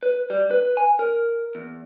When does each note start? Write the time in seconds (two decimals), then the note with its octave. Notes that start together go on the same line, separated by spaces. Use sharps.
0.03 B4
0.30 G3
0.51 B4
0.77 G#5
0.99 A#4
1.55 E2